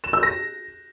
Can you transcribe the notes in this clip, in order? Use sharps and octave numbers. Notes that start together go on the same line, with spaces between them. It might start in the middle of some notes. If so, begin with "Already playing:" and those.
E7
E6
A#6